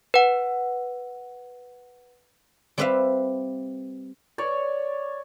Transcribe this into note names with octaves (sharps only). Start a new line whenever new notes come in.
B4 F#5
G3 C4 G4 B4 E5 F5
C#5 D5